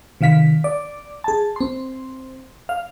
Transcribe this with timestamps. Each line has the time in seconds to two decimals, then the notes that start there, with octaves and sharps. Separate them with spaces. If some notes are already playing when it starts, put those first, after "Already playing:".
0.21 C3 D#3 F5 B6
0.64 D5
1.24 G#4 A5
1.56 C4 C6
2.69 F5